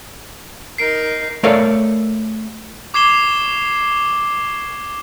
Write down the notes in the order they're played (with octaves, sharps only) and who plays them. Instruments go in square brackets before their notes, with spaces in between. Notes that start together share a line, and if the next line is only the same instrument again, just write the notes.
[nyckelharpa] D#4 A#4 [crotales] C7 D7
[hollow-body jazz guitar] A3 A4 A#4 C#5 D5 F5
[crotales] C#6 D6 G#6 C7 E7 G7